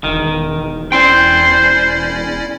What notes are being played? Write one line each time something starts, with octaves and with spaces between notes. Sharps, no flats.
E1 D#3
C#4 E4 C5 D5 G5 C6